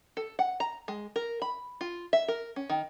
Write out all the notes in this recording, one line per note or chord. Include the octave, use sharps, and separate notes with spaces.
A4
F#5
A#5
G#3
A#4
B5
F4
E5
A#4
C#4
D#3